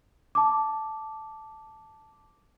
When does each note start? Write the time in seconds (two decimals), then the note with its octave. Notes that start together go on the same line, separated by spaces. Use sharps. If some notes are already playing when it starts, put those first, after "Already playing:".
0.35 A5 D6